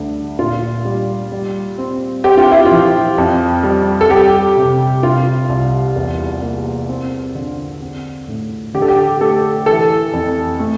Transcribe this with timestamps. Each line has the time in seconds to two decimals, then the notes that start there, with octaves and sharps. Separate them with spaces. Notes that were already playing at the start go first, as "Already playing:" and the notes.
Already playing: D2 G3
0.39 A#2 F4
0.85 G3
1.32 G3
1.78 C4
2.24 C4 G4
2.38 F4
2.51 E4
2.65 F4
2.71 F3
3.18 F2
3.63 G3
4.01 A4
4.10 G3 G4
4.57 C3
5.02 C3 F4
5.49 C2
5.96 E2
6.42 A#3
6.88 C4
7.35 D3
7.81 C4
8.28 A2
8.74 D3 G4
8.82 A4
8.88 G4
9.21 A3 A4
9.66 E3 A4
10.13 F2
10.60 A3